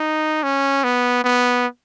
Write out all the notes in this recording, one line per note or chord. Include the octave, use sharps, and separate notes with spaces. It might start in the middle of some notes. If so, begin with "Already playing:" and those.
Already playing: D#4
C#4
B3
B3